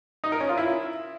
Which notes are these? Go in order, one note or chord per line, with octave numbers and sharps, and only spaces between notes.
D#4
A#4
C#4
F4
E4